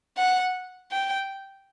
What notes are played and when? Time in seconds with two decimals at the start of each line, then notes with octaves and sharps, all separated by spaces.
0.17 F#5
0.91 G5